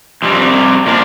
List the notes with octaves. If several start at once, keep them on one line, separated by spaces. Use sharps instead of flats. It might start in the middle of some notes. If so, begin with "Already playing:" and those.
F2 C3 G3
A#2 F3 D4 A#4